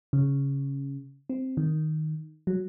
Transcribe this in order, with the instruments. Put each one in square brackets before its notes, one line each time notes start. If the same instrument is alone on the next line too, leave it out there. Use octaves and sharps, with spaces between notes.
[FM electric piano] C#3
C4
D#3
F#3